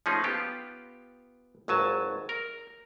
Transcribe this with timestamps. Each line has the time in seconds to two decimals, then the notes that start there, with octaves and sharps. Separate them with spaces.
0.06 F3 A3 C#4 D#4 G#4
0.24 B3 F4 G4
1.68 G#1 C#2 F#3 G#5 A5
2.29 A#4